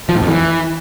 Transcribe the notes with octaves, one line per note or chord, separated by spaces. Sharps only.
F3
A2
F2
E3